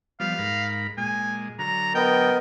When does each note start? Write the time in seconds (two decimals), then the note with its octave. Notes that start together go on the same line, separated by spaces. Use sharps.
0.20 F3 G3 B3 F5
0.38 G#2 A#4 B5
0.98 A#2 G#3 G#5
1.59 D3 F#3 A#5
1.95 B3 A#4 D#5 G5